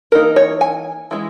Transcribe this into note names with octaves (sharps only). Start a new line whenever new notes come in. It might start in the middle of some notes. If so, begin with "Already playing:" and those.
E3 A#3 D#4 A#4
C#5
G#5
E3 G#3 C#4 E4